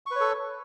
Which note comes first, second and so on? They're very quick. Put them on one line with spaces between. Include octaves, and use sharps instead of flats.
C#6 B4 C#5 A4